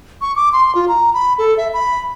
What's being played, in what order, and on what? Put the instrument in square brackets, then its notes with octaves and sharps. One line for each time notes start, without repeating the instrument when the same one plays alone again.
[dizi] C#6
D6
C6
F4
A#5
B5
A4
E5
B5